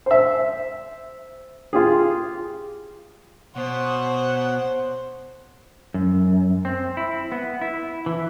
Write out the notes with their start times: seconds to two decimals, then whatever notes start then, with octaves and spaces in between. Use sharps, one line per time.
0.06 C5 E5
1.73 F4 G4 G#4
3.56 B2 C5 C#5 F#5
5.94 F#2
6.65 C4
6.97 E4
7.32 B3
7.61 E4
8.06 E3